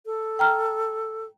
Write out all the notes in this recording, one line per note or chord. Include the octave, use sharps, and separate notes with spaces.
A4
G5 A#5 F6